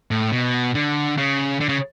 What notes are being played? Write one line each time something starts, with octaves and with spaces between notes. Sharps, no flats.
A2
B2
D3
C#3
D3
C#3